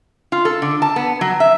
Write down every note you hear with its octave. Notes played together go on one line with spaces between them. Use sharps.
F4
A4
D3
A5
B3
F#3
E5